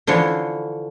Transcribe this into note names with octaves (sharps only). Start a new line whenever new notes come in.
D3 E3 F3 C#5